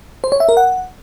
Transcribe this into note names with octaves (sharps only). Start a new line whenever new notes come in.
C5
C#5
E5
A#4
F#5